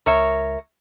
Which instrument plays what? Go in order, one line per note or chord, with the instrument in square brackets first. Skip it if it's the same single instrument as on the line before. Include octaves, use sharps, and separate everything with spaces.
[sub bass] C#2 [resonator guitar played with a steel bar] A#4 C#5 E5